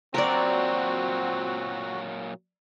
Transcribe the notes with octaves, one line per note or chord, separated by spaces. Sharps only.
A#2 F#3 C4 F#4 A#4 D5